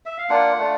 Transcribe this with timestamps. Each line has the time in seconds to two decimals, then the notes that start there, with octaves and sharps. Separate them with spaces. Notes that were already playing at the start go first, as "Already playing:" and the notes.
0.06 E5
0.18 F5
0.29 A#3 D4 F4 F#5
0.58 A3 D4 F4